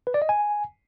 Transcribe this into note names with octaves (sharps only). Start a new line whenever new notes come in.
B4
D5
D#5
G#5